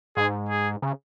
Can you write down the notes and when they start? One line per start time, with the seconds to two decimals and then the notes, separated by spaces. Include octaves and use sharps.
0.17 G#2 G#4
0.49 G#4
0.82 C#3